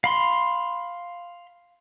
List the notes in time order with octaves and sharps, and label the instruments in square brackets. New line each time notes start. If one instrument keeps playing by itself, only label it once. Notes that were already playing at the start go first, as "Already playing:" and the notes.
[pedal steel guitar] F5 B5 C6